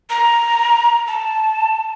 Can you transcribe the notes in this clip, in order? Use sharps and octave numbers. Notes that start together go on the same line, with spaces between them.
A#5
A5